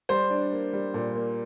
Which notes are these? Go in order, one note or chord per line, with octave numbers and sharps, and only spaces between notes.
G3 C5
D4
A#3
G3
A#2
A#3